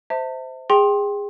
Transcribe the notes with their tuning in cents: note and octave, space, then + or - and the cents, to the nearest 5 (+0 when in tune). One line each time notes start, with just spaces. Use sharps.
C5 -15 E5 -20 A5 +40
G#4 -20 G5 +0 C6 +20